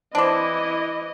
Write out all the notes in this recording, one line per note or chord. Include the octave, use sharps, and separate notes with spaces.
E3 C4 D4 E4 C5 D#5 D6